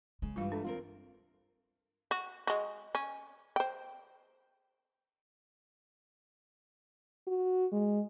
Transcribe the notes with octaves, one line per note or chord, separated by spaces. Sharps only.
C#3 G#3
G2 E3 G3 F4 F5
A3 D4
E2 C4 F4 A#4
F#4
G#3 F#4
C#4
C5 G5
F#4
G#3